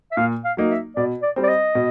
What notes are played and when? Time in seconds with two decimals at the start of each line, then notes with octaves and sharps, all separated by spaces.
0.12 E5
0.17 A#2 F5
0.44 F5
0.57 F#3 A#3 D#4
0.71 E5
0.96 B2 D5
1.22 D5
1.36 G3 C4
1.43 D5
1.48 D#5
1.75 B2